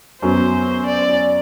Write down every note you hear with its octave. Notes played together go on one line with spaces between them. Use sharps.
F#2 F#3 B3 C5
D5